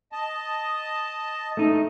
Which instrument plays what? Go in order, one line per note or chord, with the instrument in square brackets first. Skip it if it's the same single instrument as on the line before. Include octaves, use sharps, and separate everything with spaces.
[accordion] D#5 A5
[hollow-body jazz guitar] A3 D#4